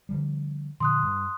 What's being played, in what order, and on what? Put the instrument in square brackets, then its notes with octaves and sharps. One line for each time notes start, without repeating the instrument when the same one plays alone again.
[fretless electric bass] D3 F3 G3
[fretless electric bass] A#2 D3 F3 [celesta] C6 D#6 F#6
[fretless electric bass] G2